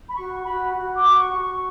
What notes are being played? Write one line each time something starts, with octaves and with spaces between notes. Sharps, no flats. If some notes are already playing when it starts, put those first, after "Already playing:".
B5
F#4 C#6
F#4 B5
F#4
D6
F#4
C#6
F#4
C#6